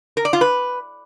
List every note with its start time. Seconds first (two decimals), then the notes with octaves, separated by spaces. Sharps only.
0.17 A#4
0.25 D5
0.33 F4
0.41 B4